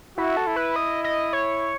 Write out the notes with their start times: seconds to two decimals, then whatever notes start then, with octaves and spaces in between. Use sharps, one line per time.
0.18 E4 F#4
0.37 A4
0.47 E4
0.56 B4
0.76 D#5
1.04 D#5
1.33 C#5